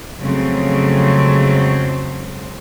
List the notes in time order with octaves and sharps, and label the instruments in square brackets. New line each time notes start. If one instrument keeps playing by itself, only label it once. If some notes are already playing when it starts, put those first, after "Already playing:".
[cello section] F2 C#3 F#3 G#3 A3 C4